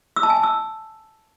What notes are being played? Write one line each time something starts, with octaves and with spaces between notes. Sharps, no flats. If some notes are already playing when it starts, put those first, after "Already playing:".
E6
A5
G#5
A5
E6